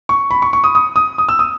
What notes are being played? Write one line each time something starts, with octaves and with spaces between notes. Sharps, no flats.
C#6
B5
C#6
C#6
D#6
D#6
D#6
D#6
E6
D#6